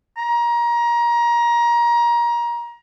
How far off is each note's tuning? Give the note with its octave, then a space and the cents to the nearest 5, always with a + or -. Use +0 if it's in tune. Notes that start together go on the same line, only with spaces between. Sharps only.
A#5 +25